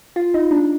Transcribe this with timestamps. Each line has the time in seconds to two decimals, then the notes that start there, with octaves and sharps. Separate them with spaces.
0.16 F4
0.34 D#4
0.51 D4